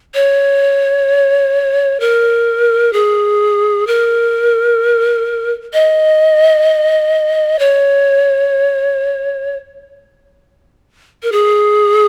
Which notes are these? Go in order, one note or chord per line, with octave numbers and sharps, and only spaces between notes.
C#5
A#4
G#4
A#4
D#5
C#5
A#4
G#4